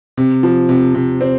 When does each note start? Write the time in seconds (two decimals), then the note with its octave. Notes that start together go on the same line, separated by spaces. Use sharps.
0.18 C3
0.43 F3
0.69 C3
0.95 C3
1.21 C4